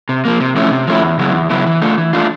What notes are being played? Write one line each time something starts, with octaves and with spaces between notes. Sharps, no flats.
C3
F3 A#3
C3
F3 A3 C#4 E4
C3
F3 A3 C#4 E4
E2
C#3 F#3 B3 E4
E2
C#3 F#3 B3 E4
E3
A3 D4 F4
E3
A3 D4 F4